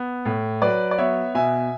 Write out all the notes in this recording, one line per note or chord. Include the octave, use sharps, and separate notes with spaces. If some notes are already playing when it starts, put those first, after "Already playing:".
Already playing: B3
A2
F#3 B4 D5
D5
B3 C#5 E5
B2 E5 G#5